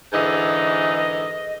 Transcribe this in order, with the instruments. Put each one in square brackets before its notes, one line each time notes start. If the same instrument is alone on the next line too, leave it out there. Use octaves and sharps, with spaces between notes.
[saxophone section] G#2 D3 E3 [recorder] D#5